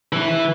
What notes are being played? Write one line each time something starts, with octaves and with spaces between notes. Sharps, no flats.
E3